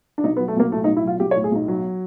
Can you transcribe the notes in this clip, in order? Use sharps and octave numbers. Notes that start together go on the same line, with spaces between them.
D4
B1 D#4
B3
F#3
A3
B1 A#3
A2 A3
D#4
B1
E4
F#3 F4
B1 G4
C#5
A2
G#4
B1 D#4
F#3